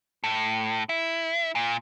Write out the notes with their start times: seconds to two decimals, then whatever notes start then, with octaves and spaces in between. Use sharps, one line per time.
0.24 A2
0.89 E4
1.55 A#2